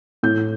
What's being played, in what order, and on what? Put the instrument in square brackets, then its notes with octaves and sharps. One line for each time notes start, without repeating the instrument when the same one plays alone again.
[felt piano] A2 G6